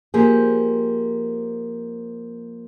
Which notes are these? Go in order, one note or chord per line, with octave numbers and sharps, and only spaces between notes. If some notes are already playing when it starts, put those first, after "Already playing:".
F3 A#3 C4 G4 G#4